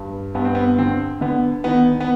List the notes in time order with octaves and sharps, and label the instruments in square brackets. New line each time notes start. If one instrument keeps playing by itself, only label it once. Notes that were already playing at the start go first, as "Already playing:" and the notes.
Already playing: [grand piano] G2
G2 B3
C4
B3
D3 C4
D3 B3
D#3 B3
B3